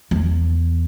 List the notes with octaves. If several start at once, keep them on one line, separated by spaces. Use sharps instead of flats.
E2